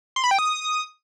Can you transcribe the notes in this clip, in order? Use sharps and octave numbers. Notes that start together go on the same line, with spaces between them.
C6
B5
G5
D#6